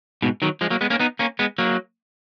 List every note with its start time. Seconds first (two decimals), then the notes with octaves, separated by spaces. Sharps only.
0.22 G#2 B2
0.42 D#3 F#3
0.61 F3 G#3
0.70 F#3 A#3
0.81 G#3 B3
0.90 A#3 C#4
1.00 B3 D#4
1.19 A#3 C#4
1.39 G#3 B3
1.58 F#3 A#3